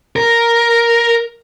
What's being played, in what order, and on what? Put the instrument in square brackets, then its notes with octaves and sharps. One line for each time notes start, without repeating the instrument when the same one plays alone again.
[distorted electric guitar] A#4